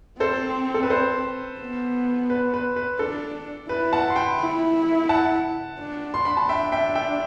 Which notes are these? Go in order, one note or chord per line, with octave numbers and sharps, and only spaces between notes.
C4 A4 C5
A4
B4
A4 C5
B3
B4
B4
B4
D4 A4
E4 B4
F#5 A5
C6
G5 B5
E4
F#5 A5
D4
C6
B5
A5
D4 E5 G5
E5 G5
E5 G5